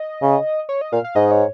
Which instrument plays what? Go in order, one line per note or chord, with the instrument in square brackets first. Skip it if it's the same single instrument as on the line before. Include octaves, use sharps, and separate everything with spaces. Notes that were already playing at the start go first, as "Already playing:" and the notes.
Already playing: [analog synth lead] D#5
[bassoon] C#3
[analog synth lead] C#5
D#5
[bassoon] A#2 [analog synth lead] F5
[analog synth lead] F5
[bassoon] G#2 [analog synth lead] D#5
[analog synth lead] C#5